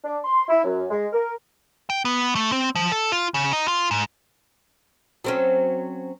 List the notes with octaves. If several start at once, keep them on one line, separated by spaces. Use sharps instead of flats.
D4
C6
E4
F#2
G#3
A#4
G5
B3
A3
C4
F3
A4
F4
C#3
D#4
F4
G#2
F#3 C4 C#4